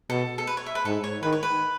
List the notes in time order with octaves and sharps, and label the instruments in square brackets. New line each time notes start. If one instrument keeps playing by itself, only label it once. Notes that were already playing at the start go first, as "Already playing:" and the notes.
[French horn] B2 [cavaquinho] A4
[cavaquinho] A4
B4
C#5
E5
B4
[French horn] G#2 [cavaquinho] A4
[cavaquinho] C#5
[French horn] D#3 [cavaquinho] B4
[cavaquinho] C#5
B4